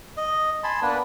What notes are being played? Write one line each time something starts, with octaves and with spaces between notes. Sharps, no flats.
D#5
G#5 A5 B5 C6
A#3 B3 D4 B4